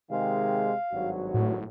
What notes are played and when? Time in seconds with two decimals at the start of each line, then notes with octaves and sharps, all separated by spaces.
0.11 C3 D#3 G#3 F5
0.93 G#1 G2 F#3 F#4
1.34 A2